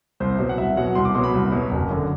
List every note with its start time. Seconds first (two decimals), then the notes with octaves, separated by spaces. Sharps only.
0.20 C2 C5
0.39 B2 F#3
0.49 F#5
0.58 C2 E5
0.76 B2 F#3 F#5
0.95 C2 C6
1.05 D6
1.15 B2 F#3 C6
1.24 B5
1.34 C2
1.52 B2 F#3
1.71 F#1
1.91 F#2 D3